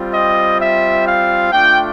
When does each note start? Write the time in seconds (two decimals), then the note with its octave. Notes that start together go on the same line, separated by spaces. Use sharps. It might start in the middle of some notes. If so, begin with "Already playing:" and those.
Already playing: G3 C4 F4
0.13 D#5
0.59 E5
1.06 F5
1.52 A3 D4 F4 G5